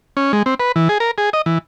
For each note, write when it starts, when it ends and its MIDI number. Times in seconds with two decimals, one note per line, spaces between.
0.17 0.32 61
0.33 0.43 56
0.46 0.54 60
0.60 0.72 71
0.76 0.88 52
0.89 0.98 68
1.00 1.11 70
1.18 1.30 68
1.33 1.42 75
1.46 1.58 52